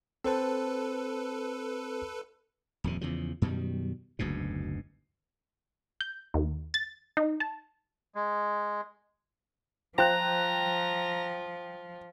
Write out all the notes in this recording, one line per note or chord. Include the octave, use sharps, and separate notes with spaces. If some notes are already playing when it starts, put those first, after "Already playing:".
C4 A4 B4 C5 A5
D#1 F2 C3
E2 C#3 F3
F#2 B2 D#3 G3
F#1 D2 G#2 B2
G6
D#2
A6
D#4
A5
G#3
F3 F4 C5 G5 A#5 F#6